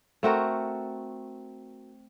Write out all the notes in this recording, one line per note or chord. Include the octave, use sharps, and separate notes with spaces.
A3 C4 F#4 A#4